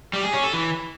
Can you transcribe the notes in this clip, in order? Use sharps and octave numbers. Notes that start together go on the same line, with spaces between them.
G3
G#4
C#4
A4
E3